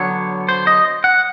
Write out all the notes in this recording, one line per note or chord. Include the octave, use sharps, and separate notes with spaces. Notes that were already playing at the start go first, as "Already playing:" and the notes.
Already playing: D3 F#3 B3 C#5
C5
D#5
F#5